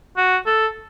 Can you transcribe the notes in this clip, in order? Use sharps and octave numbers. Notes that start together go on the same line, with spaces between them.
F#4
A4